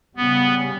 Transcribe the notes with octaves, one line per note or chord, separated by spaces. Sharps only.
C#3 G3 B3 C#4